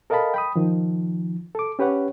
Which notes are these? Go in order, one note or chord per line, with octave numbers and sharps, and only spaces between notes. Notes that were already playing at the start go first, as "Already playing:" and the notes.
A4 A#4 D#5 F5 A5 B5
G5 B5 D#6
D#3 F3
A4 D6
C#4 G4 B4 C#5 F#5